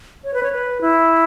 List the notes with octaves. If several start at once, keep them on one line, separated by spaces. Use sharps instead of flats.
C#5
B4
C#5
B4
E4